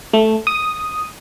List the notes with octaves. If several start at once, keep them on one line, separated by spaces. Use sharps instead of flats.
A3
D#6